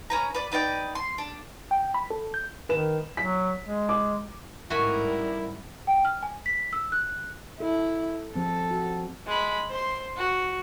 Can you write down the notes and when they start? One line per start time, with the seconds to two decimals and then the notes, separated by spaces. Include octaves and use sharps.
0.10 C#4 B4 A#5
0.35 B4 D5
0.52 D#4 B4 D5 G5
0.95 C6
1.18 D4
1.71 G5
1.94 B5
2.10 A4
2.34 G6
2.69 D#3 B4 E7
3.17 F#3 B6
3.66 G#3
3.89 D6
4.70 A1 G#2 G3 E4 F#4 A#4 G#5 B5
5.87 G5
6.05 F6
6.23 G#5
6.46 B6
6.73 E6
6.92 F#6
7.60 E4 A4
8.35 F3 C4 A4
8.71 F#4
9.26 G#3 B5
9.70 C5 C6
10.17 F#4